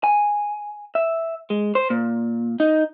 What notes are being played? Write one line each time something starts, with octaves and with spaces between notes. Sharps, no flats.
G#5
E5
G#3
C5
A#2
D#4